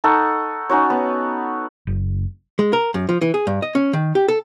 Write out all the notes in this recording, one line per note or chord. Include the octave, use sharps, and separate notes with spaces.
D#4 A4 F#5 C#6
C#4 D#4 F#4 C#5
B3
F#1
G#3
A#4
F#2
F3
E3
G#4
G2
D#5
C#4
D#3
G4
A4